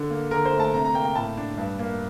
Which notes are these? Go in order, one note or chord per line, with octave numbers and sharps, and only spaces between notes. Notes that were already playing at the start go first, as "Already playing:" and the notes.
Already playing: D3
A#3
D3 A#4
C5
A3
A5
C3 A#5
A#5
A#3 G5
G5
A2 A5
D4
G2
A#3